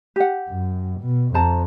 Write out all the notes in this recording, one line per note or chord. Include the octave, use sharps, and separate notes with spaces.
G4 F#5
F#2
B2
F2 C5 A5 A#5